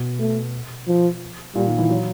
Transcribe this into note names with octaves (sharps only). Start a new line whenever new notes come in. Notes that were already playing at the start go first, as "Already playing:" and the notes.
Already playing: B2
A3
F3
A#2 G3
D#3
E3
F#3